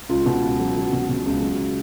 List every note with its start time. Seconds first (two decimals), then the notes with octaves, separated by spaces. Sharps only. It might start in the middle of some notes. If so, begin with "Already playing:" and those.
0.09 C#2 F4
0.26 B2
0.42 C#2
0.59 F#3
0.76 F#3
0.93 B2
1.09 B2
1.26 C#2
1.42 F#3